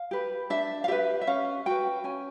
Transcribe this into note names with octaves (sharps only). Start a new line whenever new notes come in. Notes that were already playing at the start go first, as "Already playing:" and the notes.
Already playing: F5
G4 B4
D4 E5
F5
G4 B4 E5
E5
C#4 F5
F#4 B4 G5
C#4 G#5